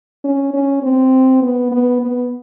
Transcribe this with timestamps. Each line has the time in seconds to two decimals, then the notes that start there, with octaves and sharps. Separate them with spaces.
0.24 C#4
0.54 C#4
0.83 C4
1.42 B3
1.72 B3
2.01 B3